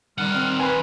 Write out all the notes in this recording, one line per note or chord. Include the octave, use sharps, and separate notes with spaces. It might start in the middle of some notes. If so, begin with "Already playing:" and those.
D#3 G3 F#5 F6
C4
B4 G#5 C6